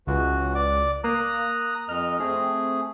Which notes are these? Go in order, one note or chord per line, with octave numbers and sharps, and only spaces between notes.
C#2 E3 F#4
D5 D6
A#3 A#5 D#6 F#6
F2 D#5 F6
A3 C4 G#4